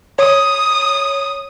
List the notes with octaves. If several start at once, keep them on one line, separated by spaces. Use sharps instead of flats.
C#5 D#6